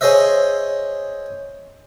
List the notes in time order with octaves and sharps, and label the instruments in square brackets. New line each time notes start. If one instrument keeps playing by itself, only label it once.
[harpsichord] G#4 C5 C#5 D#5 E5